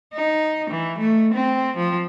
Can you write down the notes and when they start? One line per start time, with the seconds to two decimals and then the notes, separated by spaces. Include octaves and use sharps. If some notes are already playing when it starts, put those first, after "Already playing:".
0.14 D#4
0.70 E3
0.98 A3
1.34 C4
1.77 F3